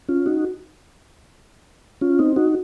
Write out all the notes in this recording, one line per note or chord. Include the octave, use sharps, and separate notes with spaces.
C#4 F4
D#4 F#4
C#4 F4
C4 D#4
D#4 F#4